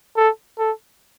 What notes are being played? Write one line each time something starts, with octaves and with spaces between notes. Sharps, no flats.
A4
A4